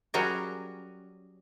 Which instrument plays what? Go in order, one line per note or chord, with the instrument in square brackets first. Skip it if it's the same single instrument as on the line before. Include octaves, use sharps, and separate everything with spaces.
[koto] F#3 G3 C#4 F#4 G#4 A#4